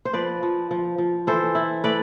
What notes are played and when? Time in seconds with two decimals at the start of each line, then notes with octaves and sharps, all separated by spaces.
0.05 C5
0.13 F3 B4 D5
0.43 F3
0.71 F3
0.98 F3
1.27 E3 A4 C5
1.55 E4
1.84 A3 B4 D5